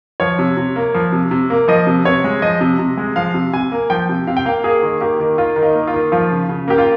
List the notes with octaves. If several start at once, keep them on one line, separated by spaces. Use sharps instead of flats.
F3 C#5
C3
C3
A#3
F3
C3
C3
A#3
F3 D#5
C3
C3 C#5
G#3
F3 D#5
C3
C3
G#3
F3 F5
C3
C3 G#5
A#3
F3 G5
C3
C3 F5
G5
A#3 F5
A#3 G#4
D#3
A#3 G4
D#3
A#3 F4
D#3
D#4
A#3
F4
D#3
F3 F4
C#3
C#3
A#3 G4
F4